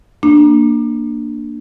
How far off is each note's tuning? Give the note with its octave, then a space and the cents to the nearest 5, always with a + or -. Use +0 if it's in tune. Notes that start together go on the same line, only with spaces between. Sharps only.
A#3 +0 D4 +10